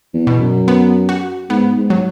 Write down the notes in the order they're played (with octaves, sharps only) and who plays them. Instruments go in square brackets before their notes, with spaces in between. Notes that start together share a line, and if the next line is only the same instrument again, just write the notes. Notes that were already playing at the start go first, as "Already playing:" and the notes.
[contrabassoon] E2
[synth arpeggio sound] B2
[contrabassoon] F#2
[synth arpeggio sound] B3
F#4
[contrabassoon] G#2 [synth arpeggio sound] B3
[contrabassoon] G#2
[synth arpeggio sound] F#3